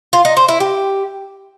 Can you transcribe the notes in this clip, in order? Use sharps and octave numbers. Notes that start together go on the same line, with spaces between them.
F4
D#4
C5
E4
G4